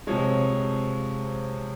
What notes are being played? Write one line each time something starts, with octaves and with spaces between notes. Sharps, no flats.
C3 F3 G#3 C#5